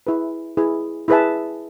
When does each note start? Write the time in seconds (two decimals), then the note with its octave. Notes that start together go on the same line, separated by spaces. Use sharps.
0.07 E4 G#4 B4
0.57 E4 G#4 B4
1.08 E4 G#4 B4 E5 A5